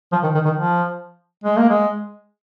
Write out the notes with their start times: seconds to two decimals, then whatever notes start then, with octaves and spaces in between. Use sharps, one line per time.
0.12 F3
0.23 D#3
0.34 D#3
0.45 D#3
0.56 F3
1.44 G#3
1.57 A#3
1.69 G#3